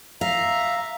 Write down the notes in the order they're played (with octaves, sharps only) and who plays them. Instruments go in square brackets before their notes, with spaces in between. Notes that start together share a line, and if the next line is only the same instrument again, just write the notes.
[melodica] E5 A#5 [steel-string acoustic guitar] F5